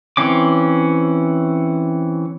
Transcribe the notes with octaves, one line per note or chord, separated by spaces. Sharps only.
E3 C4 C#4 D6